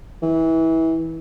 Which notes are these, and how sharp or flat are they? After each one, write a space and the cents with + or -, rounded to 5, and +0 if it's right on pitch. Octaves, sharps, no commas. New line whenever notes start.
E3 -25